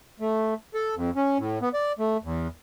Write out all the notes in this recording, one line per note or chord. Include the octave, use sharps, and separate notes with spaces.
A3
A4
F2
C#4
A2
B3
D5
A3
E2